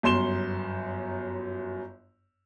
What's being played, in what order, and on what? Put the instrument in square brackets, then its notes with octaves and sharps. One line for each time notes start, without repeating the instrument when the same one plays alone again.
[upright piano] G1 F#2 C6 E7 G7